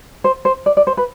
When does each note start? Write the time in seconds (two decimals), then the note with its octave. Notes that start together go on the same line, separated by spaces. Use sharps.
0.24 C5
0.45 C5
0.66 D5
0.77 D5
0.87 C5
0.97 B4